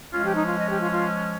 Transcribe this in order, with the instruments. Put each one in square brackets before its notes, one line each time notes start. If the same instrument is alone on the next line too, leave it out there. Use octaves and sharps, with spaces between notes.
[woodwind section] F3 G#3 C#4 F4
G4
D#4
F4
D#5
G4
F4
F4